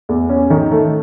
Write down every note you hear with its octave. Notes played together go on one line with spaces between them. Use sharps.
E2
C#4
D#3
A3